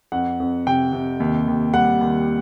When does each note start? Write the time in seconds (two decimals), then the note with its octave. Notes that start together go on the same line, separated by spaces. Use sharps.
0.12 F2 F#5
0.40 F2
0.67 C3 G5
0.93 C3
1.20 D#2
1.48 D#2
1.74 G3 F#5
2.01 D#2